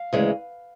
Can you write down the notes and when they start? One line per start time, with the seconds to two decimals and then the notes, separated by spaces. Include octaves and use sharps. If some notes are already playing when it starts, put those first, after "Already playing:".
Already playing: F5
0.13 D2 C#3 E3 G#3